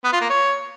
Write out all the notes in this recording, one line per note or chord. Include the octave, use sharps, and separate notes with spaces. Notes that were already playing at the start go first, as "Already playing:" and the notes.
B3
F4
A#3
C#5